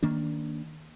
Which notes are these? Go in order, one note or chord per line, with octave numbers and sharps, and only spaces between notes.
D#3 A#3 D4